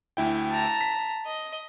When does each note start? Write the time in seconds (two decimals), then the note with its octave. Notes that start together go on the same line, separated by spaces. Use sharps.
0.17 D2 E4 G5
0.50 A5 A#5
0.81 B6
1.26 D#5